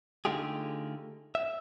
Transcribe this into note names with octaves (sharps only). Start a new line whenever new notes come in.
D3 A3 D#4 F4 G4 G#4
E5